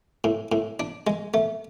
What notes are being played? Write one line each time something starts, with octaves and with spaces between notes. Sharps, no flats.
A2
A2
D4
G#3
A3